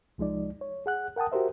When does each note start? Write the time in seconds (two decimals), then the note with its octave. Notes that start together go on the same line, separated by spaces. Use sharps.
0.18 C2 F3 G#3 D#4 D5
0.61 C#5
0.86 G#4 F#5 F#6
1.16 A#4 F#5 G5 A5 D#6
1.32 F#4 G4 A#4 C5 E5